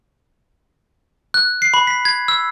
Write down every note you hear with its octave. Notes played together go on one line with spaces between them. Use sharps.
F#6
C7
B5
B6
G#6
E6